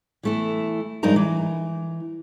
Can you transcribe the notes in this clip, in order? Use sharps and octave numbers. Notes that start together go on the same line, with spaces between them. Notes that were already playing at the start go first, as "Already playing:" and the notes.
E3 A3 E4
G2 F3 G#3 D#4 A#4 A#5
E3